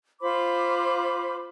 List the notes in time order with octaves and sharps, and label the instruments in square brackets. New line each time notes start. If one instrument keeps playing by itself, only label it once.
[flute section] F4 C5 B5 D6